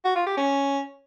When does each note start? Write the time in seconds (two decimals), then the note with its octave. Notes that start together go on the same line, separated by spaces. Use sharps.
0.05 F#4
0.16 F4
0.26 G4
0.37 C#4